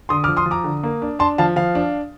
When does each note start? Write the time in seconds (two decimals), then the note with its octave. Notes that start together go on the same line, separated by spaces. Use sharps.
0.09 D3 C6 D#6
0.24 D6 F6
0.28 F3
0.37 C6 D#6
0.46 F3
0.51 A#5 D6
0.64 D3
0.83 A#3
1.02 D4
1.19 D4 A5 C6
1.38 F3 F5 A5
1.56 F3 F5
1.75 D4